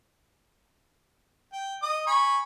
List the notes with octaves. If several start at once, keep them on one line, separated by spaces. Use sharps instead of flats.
G5
D#5 D#6
G#5 B5 C#6